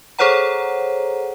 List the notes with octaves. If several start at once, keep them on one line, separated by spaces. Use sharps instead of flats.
G#4 A4 C5 C#5 F#5 A#5